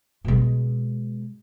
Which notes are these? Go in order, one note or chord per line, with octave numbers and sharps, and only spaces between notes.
B2 G#3